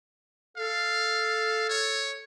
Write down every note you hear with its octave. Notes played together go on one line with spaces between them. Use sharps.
A4 F5
C#5